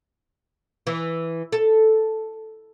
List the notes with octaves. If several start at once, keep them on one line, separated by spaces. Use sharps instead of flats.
E3
A4